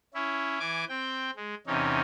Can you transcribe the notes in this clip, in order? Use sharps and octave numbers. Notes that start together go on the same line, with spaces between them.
C#4 E4
E3 G#5 D6
C4 G5
G#3
E2 C3 C#4 D#4